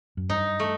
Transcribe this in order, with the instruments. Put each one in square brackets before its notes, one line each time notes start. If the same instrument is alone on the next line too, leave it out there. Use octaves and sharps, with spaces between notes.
[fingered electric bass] F#2
[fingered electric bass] G2 [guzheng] D#4
[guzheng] A3